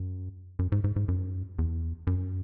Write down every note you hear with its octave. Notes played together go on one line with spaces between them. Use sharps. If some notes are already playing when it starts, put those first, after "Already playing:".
Already playing: F#2
F#2
G#2
G#2
G#2
F#2
E2
F#2